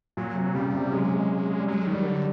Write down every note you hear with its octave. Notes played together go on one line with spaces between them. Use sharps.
A#2 F#3
C3
C#3 G3
C3
F#3 G#3
G3
F#3 G#3
D#3
G3
D3